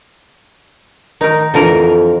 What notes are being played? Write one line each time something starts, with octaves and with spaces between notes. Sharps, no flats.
D#3 D#4 A#4
F2 D3 E3 A#4